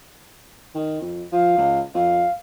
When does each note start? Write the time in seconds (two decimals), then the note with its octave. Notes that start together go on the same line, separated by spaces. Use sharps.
0.75 D#3
1.01 F2
1.32 F3 F5
1.58 C#2
1.94 F2 F5